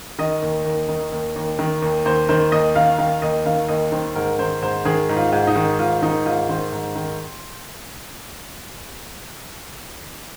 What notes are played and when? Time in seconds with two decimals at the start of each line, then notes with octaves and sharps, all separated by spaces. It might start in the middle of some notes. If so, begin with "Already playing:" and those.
0.19 D#3 D#5
0.42 D#2
0.65 D#2
0.89 D#3
1.12 D#2
1.36 D#2
1.59 D#3
1.82 D#2
2.05 D#2 C5
2.29 D#3 C5
2.52 D#2 D#5
2.75 D#3 F5
2.98 D#3 F5
3.22 D#2 D#5
3.46 D#3 F5
3.68 D#2 D#5
3.92 D#3 C5
4.15 G#2 A#4
4.39 D#3 C5
4.62 G#2 C5
4.85 D#3 G#4
5.09 G#2
5.16 F4
5.32 G#2
5.47 D#4
5.56 D#3
5.79 G#2 F4
6.02 D#3 D#4
6.25 G#2 F4
6.49 D#3 C5
6.72 G#2
6.96 D#3